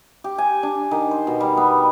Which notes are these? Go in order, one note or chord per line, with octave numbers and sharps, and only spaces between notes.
G4
G#5
D4
D#3
C5
B2
G3
B3